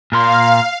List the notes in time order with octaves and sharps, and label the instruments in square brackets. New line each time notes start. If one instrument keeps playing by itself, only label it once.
[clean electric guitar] A#2 A#4 C6 [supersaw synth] F5